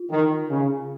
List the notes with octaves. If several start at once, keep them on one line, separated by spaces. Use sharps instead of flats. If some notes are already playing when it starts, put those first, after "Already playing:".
Already playing: F4
D#3
C#3